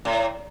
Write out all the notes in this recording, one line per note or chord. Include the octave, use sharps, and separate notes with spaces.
A2